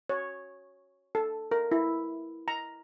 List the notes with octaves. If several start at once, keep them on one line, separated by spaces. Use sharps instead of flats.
C#5
A4
A#4
E4
A#5